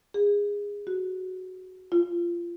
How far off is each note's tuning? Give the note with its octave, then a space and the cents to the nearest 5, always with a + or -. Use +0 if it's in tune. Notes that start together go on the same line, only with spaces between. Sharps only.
G#4 -20
F#4 +5
F4 -20